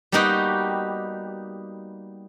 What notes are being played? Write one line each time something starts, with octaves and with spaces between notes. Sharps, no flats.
G3 A#3 B3 D#4 F#4 G4